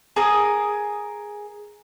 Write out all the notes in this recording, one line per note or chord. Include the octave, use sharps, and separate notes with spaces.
G#4 A#4 D#6